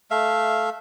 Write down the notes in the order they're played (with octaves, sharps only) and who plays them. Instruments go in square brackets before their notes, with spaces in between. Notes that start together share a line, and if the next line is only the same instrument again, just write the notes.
[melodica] A3 E5 F5